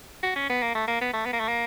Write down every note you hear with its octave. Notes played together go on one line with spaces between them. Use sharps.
F#4
C#4
B3
A#3
A3
A#3
B3
A3
B3
A#3
A3
A#3